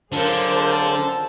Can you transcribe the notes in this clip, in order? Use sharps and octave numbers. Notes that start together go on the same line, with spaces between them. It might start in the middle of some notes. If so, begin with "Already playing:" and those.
F2 D3 F3 F#3 G#4 A#4 C5 A5